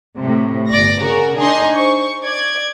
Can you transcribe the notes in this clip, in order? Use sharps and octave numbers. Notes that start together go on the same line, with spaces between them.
A2 C3
G1 D5 A#6
C#3 F#4 A#4
D4 D#4 G#4 D#5 C6
C5 C#6
D5 G#6